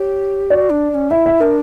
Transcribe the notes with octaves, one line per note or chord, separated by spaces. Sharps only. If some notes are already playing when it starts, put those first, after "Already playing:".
Already playing: G4 C#5
F#4 D5
D4
D4
C#4
E4 E5
E5
D4 A#4